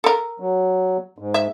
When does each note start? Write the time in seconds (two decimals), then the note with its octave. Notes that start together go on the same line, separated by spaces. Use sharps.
0.04 A4 A#4
0.40 F#3
1.18 G#2
1.34 E5